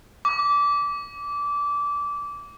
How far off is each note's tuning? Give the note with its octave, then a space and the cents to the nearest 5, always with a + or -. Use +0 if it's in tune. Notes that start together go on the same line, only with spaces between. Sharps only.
D6 -20